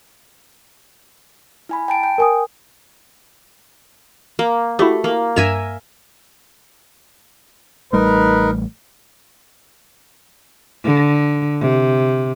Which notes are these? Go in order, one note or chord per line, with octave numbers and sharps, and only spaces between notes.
E4 G#5 B5
G5 A5 D7
G5
A#4 G#5 D#6
A#3
A3 E4 F#4 G4
A#3
G2 A#4 E5 G#5 G#6 E7
A1 G3 A3 D#4 A#4 B4
D3
C3